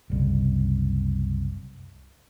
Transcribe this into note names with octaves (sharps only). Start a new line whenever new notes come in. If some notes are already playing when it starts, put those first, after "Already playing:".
F#1 C2